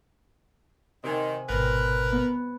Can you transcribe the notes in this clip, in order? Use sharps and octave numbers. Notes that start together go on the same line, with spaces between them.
C3 D#3 G#5
G#1 B2 A#4 B4
B3